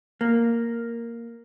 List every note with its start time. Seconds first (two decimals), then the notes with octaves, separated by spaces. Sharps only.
0.21 A#3